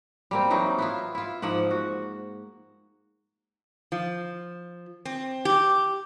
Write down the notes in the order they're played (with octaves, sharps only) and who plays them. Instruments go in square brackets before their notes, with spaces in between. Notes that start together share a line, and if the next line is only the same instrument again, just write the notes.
[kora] G3 A#3 C4
E3 F#3 A#3 D#4
B3 E4 F4
E4 F4
G#2 F3 A#3 F#5
F#4
[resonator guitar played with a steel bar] F3
C4
G4